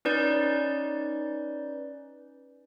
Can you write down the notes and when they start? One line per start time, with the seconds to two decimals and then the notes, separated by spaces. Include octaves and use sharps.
0.05 C#4 D#4 B4 D5 G6